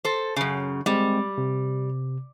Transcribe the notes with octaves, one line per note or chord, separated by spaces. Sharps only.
A4 C5
F#2 C#3
G3 G#3 C4
C3